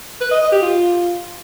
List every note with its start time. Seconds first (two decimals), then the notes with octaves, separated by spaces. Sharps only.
0.21 B4
0.31 D#5
0.42 D#5
0.52 G4
0.62 F4